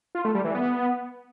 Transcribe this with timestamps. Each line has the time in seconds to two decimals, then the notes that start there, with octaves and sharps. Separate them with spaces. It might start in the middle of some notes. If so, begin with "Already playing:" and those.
0.15 F4
0.25 A3
0.35 G3
0.45 E3
0.55 B3